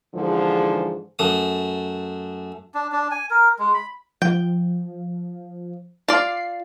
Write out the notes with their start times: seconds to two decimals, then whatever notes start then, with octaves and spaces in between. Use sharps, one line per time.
0.14 G#2 D3 E3 F3 G#4
1.19 F#2 A3 D#6
2.74 D4
2.92 D4
3.11 G#5
3.30 A#4
3.59 G#3
3.74 B5
4.22 F3 G5
6.08 F4 D5 C7